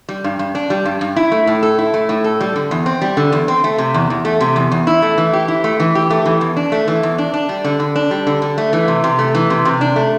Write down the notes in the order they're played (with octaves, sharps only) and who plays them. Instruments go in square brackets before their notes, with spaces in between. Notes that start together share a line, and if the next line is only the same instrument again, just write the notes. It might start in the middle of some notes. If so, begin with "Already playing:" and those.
[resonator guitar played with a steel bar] G3
G2
G2
D4
G3
G2
G2
E4
A3
A2
A4
E4
A3
A2
A4
G3
D3
E2
C4
G3
D3
E2
C4
A3
C3
E2
E2
A3
C3
E2
E2
E4
A3
E3
G4
E4
A3
E3
G4
A3
E3
E2
D4
A3
E3
E2
D4
D4
G3
D3
D3
D4
G3
D3
D3
A3
E3
C3
C3
A3
E3
C3
C3
D4
A3